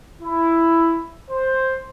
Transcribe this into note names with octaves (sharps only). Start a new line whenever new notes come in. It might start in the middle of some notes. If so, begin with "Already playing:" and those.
E4
C5